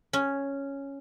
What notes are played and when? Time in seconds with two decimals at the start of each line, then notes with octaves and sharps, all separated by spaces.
0.13 C#4